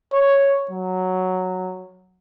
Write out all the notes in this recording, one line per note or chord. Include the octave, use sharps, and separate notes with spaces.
C#5
F#3